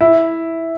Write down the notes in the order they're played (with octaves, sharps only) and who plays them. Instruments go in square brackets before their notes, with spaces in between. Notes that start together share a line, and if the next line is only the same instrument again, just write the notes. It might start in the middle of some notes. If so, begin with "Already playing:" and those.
[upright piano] E4